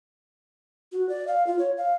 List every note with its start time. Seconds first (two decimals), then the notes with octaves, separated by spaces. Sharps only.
0.92 F#4
1.09 D5
1.27 F5
1.47 F4
1.59 C#5
1.77 F5